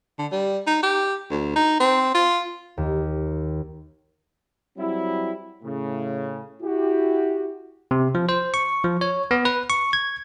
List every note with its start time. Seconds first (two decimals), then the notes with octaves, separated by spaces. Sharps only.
0.19 D3
0.32 G3
0.67 D#4
0.83 G4
1.31 D2
1.56 D#4
1.80 C4
2.15 F4
2.77 D#2
4.78 F#3 G3 C4 E4
5.63 A2 C#3
6.62 E4 F#4 G4
7.91 C3
8.15 F3
8.29 C5
8.54 C#6
8.84 F3
9.01 C#5
9.31 B3
9.45 B4
9.70 C#6
9.93 G#6